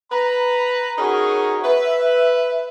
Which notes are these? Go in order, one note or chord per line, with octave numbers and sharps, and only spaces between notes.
B4 A#5 B5
C#4 D#4 F#4 G#4 A#4 C#5
B4 E5